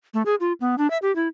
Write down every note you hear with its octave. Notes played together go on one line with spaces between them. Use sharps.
A3
G#4
F4
B3
D4
E5
G4
E4